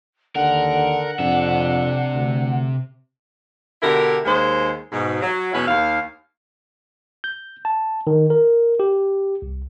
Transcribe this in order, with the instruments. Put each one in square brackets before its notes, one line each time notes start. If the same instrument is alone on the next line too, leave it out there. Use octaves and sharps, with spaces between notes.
[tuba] D#2 [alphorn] D3 [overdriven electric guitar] A#4 [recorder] F#5
[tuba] F2 [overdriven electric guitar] C3 E5 [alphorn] D4
[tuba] D2
[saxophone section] B2 D3 E4 G4 A#4
D#2 G#3 C5
G#2 B2
F#3
E2 B2 G#3 C#4 E4 B4
D#2 F5
[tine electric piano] G6
A5
D#3
A#4
G4
C2